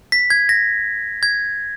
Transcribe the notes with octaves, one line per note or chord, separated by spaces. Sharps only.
B6
G#6
A#6
G#6